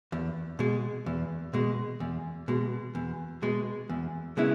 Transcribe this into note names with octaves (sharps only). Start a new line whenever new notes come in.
E2
B2 G#3
E2
B2 G#3
E2
B2 G#3
E2
B2 G#3
E2
C#3 G#3 B3 E4